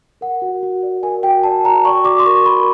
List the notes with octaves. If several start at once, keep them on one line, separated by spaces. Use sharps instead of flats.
A#4 F#5
F#4
F#4
D5
A#4 G#5
F#4 G5
D5 A5
F#4 A#5
D5 C#6
F#4 D6
C6
A#4 C#6
A#4 B5